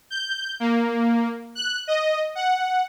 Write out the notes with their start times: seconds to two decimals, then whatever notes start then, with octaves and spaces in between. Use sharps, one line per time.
0.10 G6
0.60 A#3
1.55 F#6
1.87 D#5
2.35 F#5